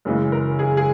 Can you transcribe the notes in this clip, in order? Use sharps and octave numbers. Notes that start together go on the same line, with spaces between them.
F#2 C#3 E3 G#3
A#4
G#4
G#4